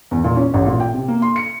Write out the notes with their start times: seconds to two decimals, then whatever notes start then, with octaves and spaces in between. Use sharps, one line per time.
0.11 E2
0.24 A#2
0.36 C#4
0.54 A1
0.67 A#2
0.80 G5
0.94 C3
1.08 A#3
1.22 C6
1.36 C#7